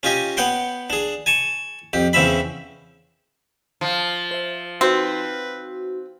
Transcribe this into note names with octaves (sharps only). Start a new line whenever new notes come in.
C#4 F4 G4 D#5 G#5
B3 C#5 F#5 G5 C6
D4 G#4
G#5 A5 C#6
F2 G4
E2 C#3 C4 C#4 E5 B5
F3
C5 E5
C4 D#4 F#4 B4